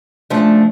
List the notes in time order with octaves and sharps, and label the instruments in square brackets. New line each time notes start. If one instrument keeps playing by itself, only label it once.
[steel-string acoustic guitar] C#3 F3 A3 D4